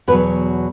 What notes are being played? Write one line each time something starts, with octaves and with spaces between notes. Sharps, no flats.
E2 B2 F#3 B4